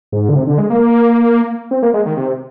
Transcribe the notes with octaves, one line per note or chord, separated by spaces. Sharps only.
G#2
D3
C3
D3
G#3
A#3
C4
A#3
G#3
D#3
C3